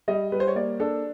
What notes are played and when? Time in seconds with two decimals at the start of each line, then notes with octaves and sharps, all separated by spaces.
0.08 G3 D#5
0.32 G3 B4
0.40 C5
0.47 C#5
0.55 A#3 D5
0.80 D4 A4